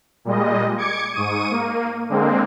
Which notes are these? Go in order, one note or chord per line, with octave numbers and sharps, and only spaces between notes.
A#2 G3 G#3 D#5
D6 G#6 C#7
G#2 C#6 D#6 D#7
A#3
D3 G#3 A#3 C4